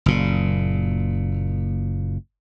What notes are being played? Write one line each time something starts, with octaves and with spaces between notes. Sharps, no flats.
F#1 A#2